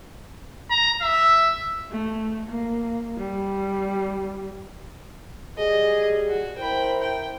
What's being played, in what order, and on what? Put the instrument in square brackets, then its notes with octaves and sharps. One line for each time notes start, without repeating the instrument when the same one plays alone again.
[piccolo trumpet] A#5
E5
[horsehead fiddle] A3
A#3
G3
[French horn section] G3 G4 G#4 [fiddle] D#5
[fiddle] F#4
[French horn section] E4 A#4 C5 [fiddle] G5 B5
[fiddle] G5